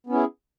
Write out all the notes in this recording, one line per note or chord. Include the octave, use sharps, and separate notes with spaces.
B3 C#4 E4 G#4